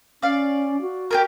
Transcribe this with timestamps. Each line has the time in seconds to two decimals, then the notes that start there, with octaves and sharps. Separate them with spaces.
0.22 C#4 D5 F5
0.81 F#4
1.11 G4 G#4 A#4